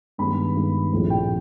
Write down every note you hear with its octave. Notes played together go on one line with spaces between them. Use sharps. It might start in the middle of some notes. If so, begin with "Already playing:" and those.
G2 D#3 G#3 B3 B5
G2 D#3 G#3 B3
A#1 A2 F3 A3 C4
G5